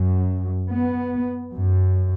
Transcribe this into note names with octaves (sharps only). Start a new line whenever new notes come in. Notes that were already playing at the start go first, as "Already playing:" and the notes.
Already playing: F#2
B3
F#2